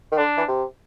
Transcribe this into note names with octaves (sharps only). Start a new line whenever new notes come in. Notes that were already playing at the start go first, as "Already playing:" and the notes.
D#3
D3 D4
E3
C3